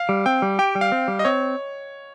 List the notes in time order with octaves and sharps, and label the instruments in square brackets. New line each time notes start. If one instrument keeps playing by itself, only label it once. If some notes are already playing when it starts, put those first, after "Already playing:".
Already playing: [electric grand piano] F5
[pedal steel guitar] G3
[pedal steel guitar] C4 [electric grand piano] G5
[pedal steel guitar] G3
[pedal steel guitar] G4 [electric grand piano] G5
[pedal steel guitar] G3
[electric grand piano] F5
[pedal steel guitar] C4
G3
[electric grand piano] D#5
[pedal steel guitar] C4 [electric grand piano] C#5